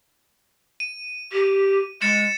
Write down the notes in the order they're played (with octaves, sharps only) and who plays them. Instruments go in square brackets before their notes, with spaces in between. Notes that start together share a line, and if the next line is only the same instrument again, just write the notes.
[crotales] D#7
[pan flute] G4
[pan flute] G#3 [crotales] A6 C#7 E7